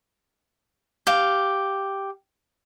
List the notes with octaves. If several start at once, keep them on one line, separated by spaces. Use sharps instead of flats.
G4 F5